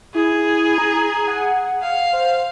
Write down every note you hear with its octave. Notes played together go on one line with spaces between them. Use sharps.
E4 G#4
A#5
F#5
F5
C5